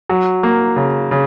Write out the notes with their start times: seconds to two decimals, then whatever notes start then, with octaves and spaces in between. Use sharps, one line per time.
0.10 F#3
0.43 A#3
0.76 C#3
1.11 C#3